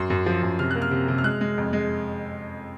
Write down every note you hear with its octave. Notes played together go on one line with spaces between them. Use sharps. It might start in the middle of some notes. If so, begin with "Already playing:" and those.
Already playing: F#2 C6
F#2
F3
F#2
C3 F6
A#3 F#6
F6
C3
C3
F6
G#3 F#6
G#3
F2
G#3